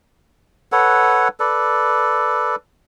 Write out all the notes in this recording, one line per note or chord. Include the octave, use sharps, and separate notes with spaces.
A4 B4 C#5 F#5
A4 B4 D5